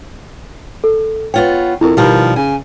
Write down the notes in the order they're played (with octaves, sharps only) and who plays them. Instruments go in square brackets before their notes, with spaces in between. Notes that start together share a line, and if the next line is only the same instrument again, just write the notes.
[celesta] A4
[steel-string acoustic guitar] B3 F4 C#5 [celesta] G5
[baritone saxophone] F2 [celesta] E4 A#4
[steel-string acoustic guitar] B2 D#3 G3 [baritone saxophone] F3
[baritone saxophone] C#3 [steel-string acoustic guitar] G#5